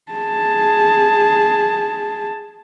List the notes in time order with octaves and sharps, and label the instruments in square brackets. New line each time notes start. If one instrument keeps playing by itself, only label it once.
[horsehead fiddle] G#4 A5